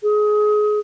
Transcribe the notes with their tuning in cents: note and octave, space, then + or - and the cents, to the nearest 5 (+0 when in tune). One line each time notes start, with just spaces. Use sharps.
G#4 +20